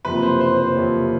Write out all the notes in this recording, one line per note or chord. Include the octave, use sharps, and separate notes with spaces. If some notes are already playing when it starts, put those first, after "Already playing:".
F#1 F2 C3 F3 A#3 B4
C5
C5
C5
F#1 F2 C3 F3 A#3 C#5